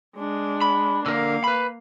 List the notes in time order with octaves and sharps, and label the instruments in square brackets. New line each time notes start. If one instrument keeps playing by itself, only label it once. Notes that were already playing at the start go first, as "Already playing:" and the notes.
[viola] G#3 D4
[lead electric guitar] B5
[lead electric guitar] D3 A#4 [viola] A#3 F5
[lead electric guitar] B4 B5